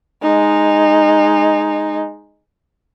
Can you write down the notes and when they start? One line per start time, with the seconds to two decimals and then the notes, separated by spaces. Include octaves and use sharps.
0.23 G#3 D#4